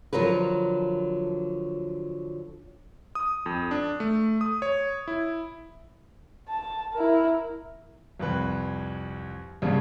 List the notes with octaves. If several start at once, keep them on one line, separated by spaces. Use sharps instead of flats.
D3 F3 F#3 A#4 B4
D#6
F2
D4
A3
D#6
C#5
E4
A5
E4 A#4
C2 F2 B4
C2 G2 C#3 A#3 B3